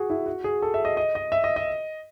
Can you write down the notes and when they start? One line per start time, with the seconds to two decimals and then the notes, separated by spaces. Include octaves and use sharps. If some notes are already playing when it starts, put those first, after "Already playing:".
Already playing: F#4 G#4
0.10 E4
0.26 F#4
0.44 G#4
0.62 A4
0.74 E5
0.85 D#5
0.97 D#5
1.15 D#5
1.32 E5
1.44 D#5
1.56 D#5